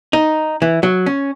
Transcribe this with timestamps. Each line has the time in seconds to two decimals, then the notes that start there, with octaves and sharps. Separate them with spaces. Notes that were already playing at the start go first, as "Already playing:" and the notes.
0.13 D#4
0.62 E3
0.83 F#3
1.06 C#4